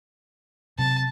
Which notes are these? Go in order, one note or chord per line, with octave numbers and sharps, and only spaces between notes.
C3 F#3 A5